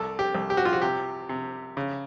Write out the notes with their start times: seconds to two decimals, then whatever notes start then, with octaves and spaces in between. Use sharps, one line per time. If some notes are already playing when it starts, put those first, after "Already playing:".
Already playing: C2 A4
0.19 G4
0.34 C2
0.50 G4
0.57 F#4
0.65 F4
0.73 F#4
0.82 C3 G4
1.29 C3
1.77 C#3